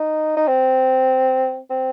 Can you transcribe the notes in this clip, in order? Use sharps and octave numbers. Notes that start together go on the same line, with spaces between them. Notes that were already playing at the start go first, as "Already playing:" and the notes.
Already playing: D#4
D#4
C4
C4